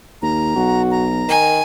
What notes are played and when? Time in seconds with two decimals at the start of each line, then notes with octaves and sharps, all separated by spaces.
0.22 D#2 A#5
0.56 B1 F#4
0.91 A#5
1.29 D#3 G#5